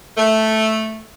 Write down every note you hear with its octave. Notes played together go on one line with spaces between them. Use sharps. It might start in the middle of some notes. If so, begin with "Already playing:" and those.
A3